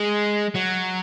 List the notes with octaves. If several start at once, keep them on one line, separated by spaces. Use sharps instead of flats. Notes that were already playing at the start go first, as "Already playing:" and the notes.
Already playing: G#3
F#3